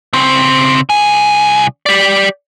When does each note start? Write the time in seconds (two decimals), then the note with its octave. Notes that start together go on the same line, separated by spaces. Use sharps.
0.13 C#3 C4
0.90 C2 G#5
1.86 G4 D5